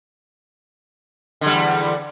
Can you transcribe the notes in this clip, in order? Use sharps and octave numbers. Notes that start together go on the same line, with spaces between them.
E2 D3 G3